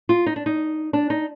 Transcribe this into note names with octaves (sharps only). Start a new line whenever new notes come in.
F4
D#4
D4
D#4
D4
D#4